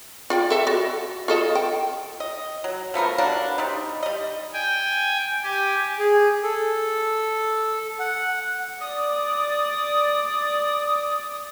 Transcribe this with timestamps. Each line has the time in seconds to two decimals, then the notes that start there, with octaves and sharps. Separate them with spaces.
0.30 F4 D5 G5
0.50 A4 E5
0.67 F#4 D5
1.28 F4 A4 D#5
1.55 G5
2.20 D#5
2.64 F#3
2.94 F3 A3 B3 A#4
3.18 F#3 G3 A#3 D4
3.58 G3 C4 D#4
4.03 G3 D#5
4.53 G5 G#5
5.43 G4 G#5
5.99 G#4
6.43 A4
8.00 F#5
8.81 D5 D#6